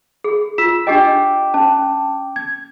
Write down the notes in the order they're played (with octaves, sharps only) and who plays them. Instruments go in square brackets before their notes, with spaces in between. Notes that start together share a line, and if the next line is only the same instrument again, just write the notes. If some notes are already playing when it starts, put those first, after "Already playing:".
[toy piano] G#4
[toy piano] F4 [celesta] E6 B6 E7
[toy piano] D4 G4 D#5 [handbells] G5 D6
[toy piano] C#4 [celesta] A5
[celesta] G#6